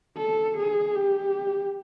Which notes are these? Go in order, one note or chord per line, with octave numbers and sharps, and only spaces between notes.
A4
G#4
G4